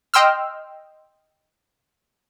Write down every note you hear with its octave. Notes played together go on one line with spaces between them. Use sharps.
D#5 G5 C6 E6 F6